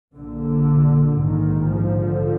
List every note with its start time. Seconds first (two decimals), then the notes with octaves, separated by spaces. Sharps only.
0.16 A#1 A#2 D3
1.19 A#1 G#2 D#3
1.70 D3 F3